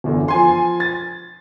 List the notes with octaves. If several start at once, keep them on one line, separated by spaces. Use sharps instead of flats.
G1 E2 D3
F3 G#5 C6
A6